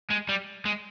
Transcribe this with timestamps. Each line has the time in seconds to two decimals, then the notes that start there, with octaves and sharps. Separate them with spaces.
0.11 G#3
0.29 G3
0.65 G#3